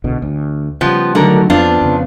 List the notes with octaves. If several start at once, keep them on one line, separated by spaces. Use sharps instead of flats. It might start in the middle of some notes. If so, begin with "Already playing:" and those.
C2 B2 D3
D2
C#3 F3 G3 B3
D3 D#3 F#3 A3 A#4
F2 B3 C4 D4 F4
F2 C#3